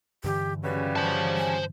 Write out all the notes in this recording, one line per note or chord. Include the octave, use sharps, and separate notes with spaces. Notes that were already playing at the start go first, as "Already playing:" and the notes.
G2 D3 E3 G4
C#3 F#3 G3 B4
C5 A5
G#5